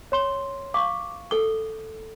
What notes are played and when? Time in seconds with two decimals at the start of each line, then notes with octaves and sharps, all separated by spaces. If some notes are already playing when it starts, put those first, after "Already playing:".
0.12 C#5 C6 G7
0.74 F5 C#6 D6
1.31 A4 D6 G7